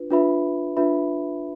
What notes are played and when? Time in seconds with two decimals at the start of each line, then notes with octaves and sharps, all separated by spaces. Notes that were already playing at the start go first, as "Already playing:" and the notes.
Already playing: D4 F4 B4
0.10 D4 F4 B4 E5 B5
0.77 D4 F4 B4 E5 B5